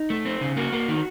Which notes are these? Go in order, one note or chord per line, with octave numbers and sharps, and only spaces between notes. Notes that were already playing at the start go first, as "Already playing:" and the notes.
Already playing: D#4
A3
C4
C#3
A#3 F#4
A#3
D#3